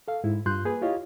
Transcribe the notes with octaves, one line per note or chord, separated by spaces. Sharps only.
A4 F5
G#2 E4
G2 F4 C6 F#6 G6
A#3 G#4 B4
E4 F4 G4 C#5 D#5 F5